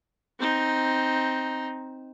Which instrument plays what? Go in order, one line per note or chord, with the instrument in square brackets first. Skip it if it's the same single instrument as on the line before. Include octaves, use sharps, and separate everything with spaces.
[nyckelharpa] C4 D#4